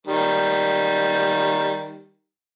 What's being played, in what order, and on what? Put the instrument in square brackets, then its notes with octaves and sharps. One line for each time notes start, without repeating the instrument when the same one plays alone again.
[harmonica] D#3 G3